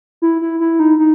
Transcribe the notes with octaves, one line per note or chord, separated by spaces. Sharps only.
E4
E4
E4
D#4
D#4